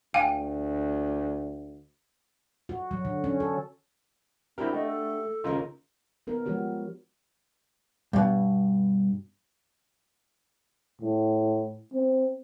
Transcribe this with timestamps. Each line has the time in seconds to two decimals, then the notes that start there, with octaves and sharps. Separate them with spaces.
0.14 D2 F5 G5 G#5
2.69 F#4
2.91 F#3
3.05 D3
3.24 C#4
3.40 A4
4.58 C4 D4 E4 F#4 G4 A#4
4.74 A3 D#5
4.87 A4
5.44 D#2 C#3 D#4 F4 A#4
6.27 B3 D#4 A#4
6.45 F3 G#3 F#4 G4 C#5
8.13 G2 B2
11.02 A2
11.93 C4